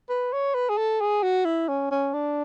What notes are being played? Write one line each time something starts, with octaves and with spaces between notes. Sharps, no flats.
B4
C#5
B4
G#4
A4
G#4
F#4
E4
C#4
C#4
D4